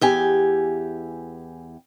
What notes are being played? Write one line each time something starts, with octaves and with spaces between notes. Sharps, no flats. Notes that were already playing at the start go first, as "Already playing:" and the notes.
E2 G4 G#5